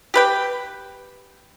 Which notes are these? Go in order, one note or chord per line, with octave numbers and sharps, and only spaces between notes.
G4 B4 G5